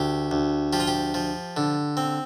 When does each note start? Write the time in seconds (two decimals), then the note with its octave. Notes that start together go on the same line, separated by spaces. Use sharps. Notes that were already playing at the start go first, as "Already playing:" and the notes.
Already playing: D2 G4
0.31 D2
0.73 F3 G4
0.80 F4
0.88 G4
1.14 F3
1.57 D3
1.97 C4